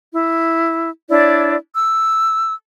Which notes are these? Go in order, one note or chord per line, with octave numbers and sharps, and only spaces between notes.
E4
D4 E4 C#5 D5
E6